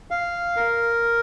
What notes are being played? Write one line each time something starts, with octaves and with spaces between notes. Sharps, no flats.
F5
A#4